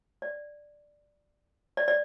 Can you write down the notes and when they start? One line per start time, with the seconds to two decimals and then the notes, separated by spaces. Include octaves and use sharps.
0.22 D5
1.77 D5
1.88 D5